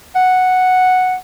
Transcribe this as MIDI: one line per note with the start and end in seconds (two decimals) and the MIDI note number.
0.15 1.16 78